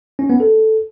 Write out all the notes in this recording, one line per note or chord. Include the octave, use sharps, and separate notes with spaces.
C#4
B3
A4